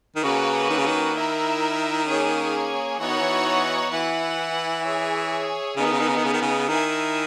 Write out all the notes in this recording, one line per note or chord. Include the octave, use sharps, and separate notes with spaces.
D#3
C#3 A#3 C#4 F#4 B4
D#3
C#3
D#3
E4 A#4 E5
A#3 C#4 G#4 C#5 G#5
E3 B3 D#4 F#4 C#5 F#5
D#3
E3
E3 E4 B4 F#5
G#4 C#5 E5
C#3 B3 D#4 G#4
D#3
C#3
D#3
C#3
D#3
C#3
D#3
C#3
D#3 E4 A#4 E5 G#5